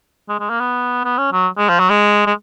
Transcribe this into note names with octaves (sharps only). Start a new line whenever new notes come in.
G#3
G#3
A#3
B3
B3
C#4
F#3
G#3
F3
F#3
G#3
G#3